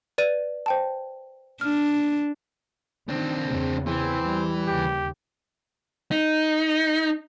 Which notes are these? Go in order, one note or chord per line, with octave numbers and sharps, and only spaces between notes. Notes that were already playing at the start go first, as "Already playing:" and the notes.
B4 D5 D#7
C5 G5 A5
D4 F6
D#3 C4 D4
E2 C#3
E3 C4
G3
D#2 C#3 G4
D#4